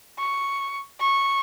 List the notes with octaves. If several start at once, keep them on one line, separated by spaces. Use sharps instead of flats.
C#6
C#6